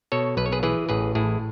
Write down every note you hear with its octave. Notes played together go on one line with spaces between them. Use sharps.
B2 A4 C#5
B1 B4
C#5
G#4 B4
E3 G#4 B4
A1 G#4 B4
A2 E4 G#4